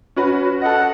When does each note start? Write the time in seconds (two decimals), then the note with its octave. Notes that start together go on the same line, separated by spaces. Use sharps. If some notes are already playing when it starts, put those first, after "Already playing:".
0.16 C#4 F#4 B4
0.62 A4 D#5 F#5